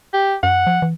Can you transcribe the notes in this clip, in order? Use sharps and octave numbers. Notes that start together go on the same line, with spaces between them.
G4
F#2 F#5
F3
E3